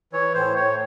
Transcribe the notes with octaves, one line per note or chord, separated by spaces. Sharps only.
E3 C#5
A2 C5
A2 C#5